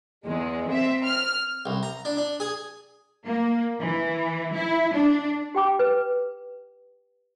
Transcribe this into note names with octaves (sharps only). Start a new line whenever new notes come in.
E2 G#3
C4 E5
F6
C2
A#5
D4
D4
G#4
A#3
E3
E4
D4
G4 G5 D6
B4